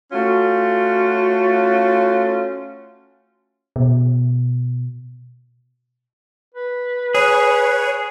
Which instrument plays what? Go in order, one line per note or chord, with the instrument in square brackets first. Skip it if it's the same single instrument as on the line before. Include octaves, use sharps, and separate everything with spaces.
[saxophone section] A3 C#4 F4 F#4
[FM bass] B2
[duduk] B4
[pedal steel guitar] G#4 [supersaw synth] C#5 [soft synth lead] F#6